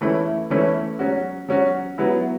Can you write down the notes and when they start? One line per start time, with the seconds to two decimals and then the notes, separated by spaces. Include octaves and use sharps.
0.01 E3 A3 C#4 E4
0.50 E3 A3 C#4 E4
0.99 F#3 C#4 F#4
1.48 F#3 C#4 F#4
1.98 F#3 B3 E4